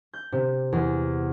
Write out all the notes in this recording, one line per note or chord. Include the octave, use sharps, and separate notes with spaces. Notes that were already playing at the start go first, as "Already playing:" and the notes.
G6
C3
E2